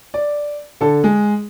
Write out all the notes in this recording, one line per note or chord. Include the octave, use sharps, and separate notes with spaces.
D5
D3 A4
G#3